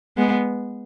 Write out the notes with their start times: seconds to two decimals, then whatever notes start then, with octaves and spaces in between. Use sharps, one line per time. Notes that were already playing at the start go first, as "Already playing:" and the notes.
0.17 G#3 B3